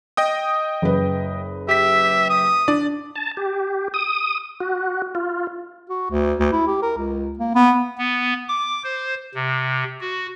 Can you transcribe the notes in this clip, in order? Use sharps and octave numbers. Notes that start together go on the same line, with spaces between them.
D#5 G5 D#6
F#1 B4
G4 E5 B6
D#6
D4 D5
A5
G4
D#6
F#4
F4
F#4
D2
D2
E4
G4
A#4
C#2
A#3
B3
B3
D6
C5
C3
F#4